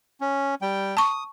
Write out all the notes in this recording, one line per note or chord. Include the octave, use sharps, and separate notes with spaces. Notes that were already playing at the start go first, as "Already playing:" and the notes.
C#4
G3 G5
A5 C#6 D#6